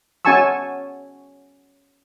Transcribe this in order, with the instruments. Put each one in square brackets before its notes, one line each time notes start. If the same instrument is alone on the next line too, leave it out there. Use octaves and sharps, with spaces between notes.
[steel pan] C#4 F#4 G#5 A5 C#6 E6